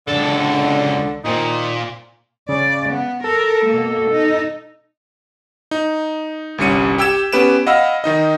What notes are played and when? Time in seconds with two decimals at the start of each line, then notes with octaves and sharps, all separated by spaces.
0.08 C#2 D3 A4
1.25 A#2 D#3 C4 D#4
2.49 C#3 D5
2.89 B3
3.24 A4 A#4
3.66 B2 A#3
4.11 D#4
5.71 D#4
6.58 G1 C2 G3 C#4 C#7 D#7
6.98 G4 G5 E6 G#6 E7
7.33 B3 C#4 G4 B4 D7 E7
7.67 D#5 F5 F#5 B5 E6 F6
8.04 D#3 D#4 D#5